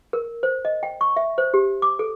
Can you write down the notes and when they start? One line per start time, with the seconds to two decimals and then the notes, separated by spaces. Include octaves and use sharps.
0.13 A#4
0.43 C5
0.65 D#5
0.83 G5
1.01 C#6
1.16 E5
1.38 C5
1.54 G4
1.82 D6
1.99 A4